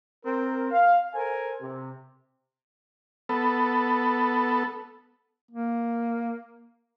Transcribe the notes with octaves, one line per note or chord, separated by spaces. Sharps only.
C4 A#4
F5
A4 A#4 C5 G#5
C3
B3 A4
A#3